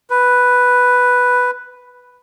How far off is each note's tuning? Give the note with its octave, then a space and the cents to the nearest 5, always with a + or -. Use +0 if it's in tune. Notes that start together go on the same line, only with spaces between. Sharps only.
B4 +0